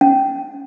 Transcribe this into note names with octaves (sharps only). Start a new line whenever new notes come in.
C#4